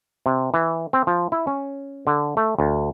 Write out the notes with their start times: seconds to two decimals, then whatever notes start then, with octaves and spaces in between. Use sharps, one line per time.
0.26 C3
0.54 E3
0.93 C4
1.07 F3
1.32 E4
1.47 C#4
2.07 D3
2.37 A3
2.59 D2